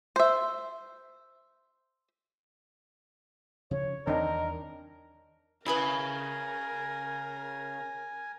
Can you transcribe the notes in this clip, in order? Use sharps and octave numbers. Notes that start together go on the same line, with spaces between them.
C5 E5
C#3 F3 C#4 C#5
E2 D#3 C4 D4 D#4 A#4 D#5
C#3 E4 G#4 A#4 B4 G#5 B5